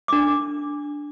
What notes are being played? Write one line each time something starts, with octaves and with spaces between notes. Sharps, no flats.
D4 D6